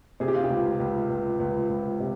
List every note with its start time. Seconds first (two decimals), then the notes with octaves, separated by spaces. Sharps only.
0.20 C3 G#4
0.28 G4
0.35 F4
0.44 G4
0.50 C#2
0.80 C#2
1.10 C#2
1.40 C#2
1.69 C#2
2.00 C3